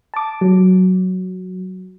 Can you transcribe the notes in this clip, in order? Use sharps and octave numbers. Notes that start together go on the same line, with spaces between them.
A5 D6
F#3